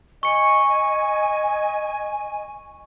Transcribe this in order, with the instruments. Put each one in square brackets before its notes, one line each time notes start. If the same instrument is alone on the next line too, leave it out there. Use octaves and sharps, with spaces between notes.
[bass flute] D#5 [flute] G#5 [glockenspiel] C#6 C#7